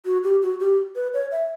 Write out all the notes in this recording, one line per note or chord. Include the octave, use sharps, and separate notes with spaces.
F#4
G4
F#4
G4
B4
C#5
E5